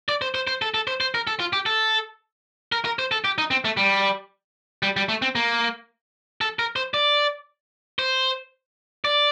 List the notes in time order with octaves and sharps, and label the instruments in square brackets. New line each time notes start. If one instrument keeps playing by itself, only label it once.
[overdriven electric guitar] D5
C5
C5
C5
A4
A4
C5
C5
A#4
A4
F4
G4
A4
A#4
A#4
C5
A4
G4
D#4
C4
A3
G3
G3
G3
A3
C4
A#3
A4
A#4
C5
D5
C5
D5